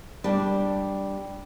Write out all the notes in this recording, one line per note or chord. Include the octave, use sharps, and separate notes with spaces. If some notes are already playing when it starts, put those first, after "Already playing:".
G3 D4